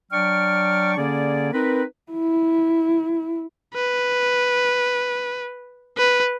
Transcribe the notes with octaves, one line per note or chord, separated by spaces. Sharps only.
F#3 D4 D5 G5 C#6 F6
D3 A#3 C#4 G#4 D5
C4 D#4 A#4 B4
E4
B4
B4